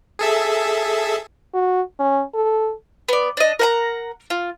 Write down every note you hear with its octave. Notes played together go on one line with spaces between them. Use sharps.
G#4 A4 E5
F#4
C#4
A4
B3 D5
D4 D#5
A#4 F#5 A#5
F4